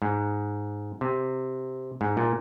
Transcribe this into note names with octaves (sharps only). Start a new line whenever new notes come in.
G#2
C3
G#2
A#2